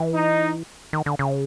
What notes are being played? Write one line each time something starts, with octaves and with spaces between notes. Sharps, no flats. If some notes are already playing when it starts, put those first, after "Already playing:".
Already playing: E3
D#4
D#3
D3
C#3